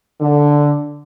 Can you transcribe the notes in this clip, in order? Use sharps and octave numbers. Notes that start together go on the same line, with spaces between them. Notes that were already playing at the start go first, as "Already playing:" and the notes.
D3